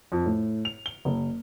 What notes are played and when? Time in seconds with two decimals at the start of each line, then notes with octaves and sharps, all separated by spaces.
0.12 F2
0.26 A2
0.65 F7
0.86 G7
1.05 F#1